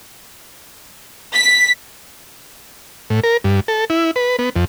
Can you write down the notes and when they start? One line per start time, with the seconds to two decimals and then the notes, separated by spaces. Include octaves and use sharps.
1.33 B6
3.10 A2
3.24 A#4
3.44 G2
3.68 A4
3.90 E4
4.16 B4
4.39 B3
4.56 F2